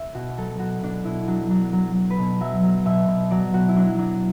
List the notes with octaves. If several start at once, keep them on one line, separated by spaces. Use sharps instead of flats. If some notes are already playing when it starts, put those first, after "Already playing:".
Already playing: E5
B2 F#4
F#3 A4
B2 F#4
B2 D4
B2 E4
F#3 D4
F#3 D4
F#3
F#3
B4
B2
F#3 E5
F#3
B2 E5
B2
F#3 D5
B2 F#4
E4
F#3 D4
F#3 D4